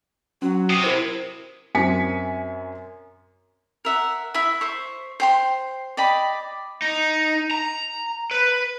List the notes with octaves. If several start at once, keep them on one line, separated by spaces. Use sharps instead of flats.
F#3 C#4
C3 D#6 C7 D#7
E4 A#4 C5
F#2 C4 G#5 B6 C#7
A#4 E5 F#5
E4 E5
C5 C#6
C5 G5 C6
D5 D#5 G5 B5
D#4
A#5
B4